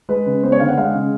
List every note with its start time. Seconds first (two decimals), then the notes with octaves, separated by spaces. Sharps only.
0.09 G#3 B4
0.26 C#3
0.44 B3 C5
0.52 C#5
0.60 D3 F5
0.69 F#5
0.77 G#3 F5
0.95 C#3